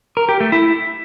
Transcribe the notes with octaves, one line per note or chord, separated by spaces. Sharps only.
A#4
G4
A3
E4